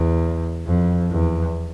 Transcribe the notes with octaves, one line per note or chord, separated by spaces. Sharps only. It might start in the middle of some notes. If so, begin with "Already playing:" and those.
Already playing: E2
F2
E2